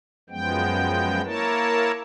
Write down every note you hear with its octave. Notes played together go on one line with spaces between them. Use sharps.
F#2 F3 G#3 B3 G5
A#3 E4 A#4 C#5 A5